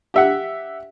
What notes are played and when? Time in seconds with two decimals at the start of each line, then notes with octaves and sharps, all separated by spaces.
0.14 G4 E5 F#5